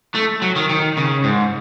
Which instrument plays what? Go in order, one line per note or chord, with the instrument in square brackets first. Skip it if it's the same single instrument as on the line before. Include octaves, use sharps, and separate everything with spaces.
[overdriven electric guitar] A3
F#3
D#3
D#3
C#3
G#2